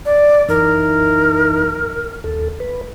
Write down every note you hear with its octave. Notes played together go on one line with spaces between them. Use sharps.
D5
F#2 E3 D#4 A#4
D#2 A4
B4